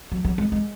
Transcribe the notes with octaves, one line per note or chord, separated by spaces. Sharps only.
F#3
F#3
G#3
G#3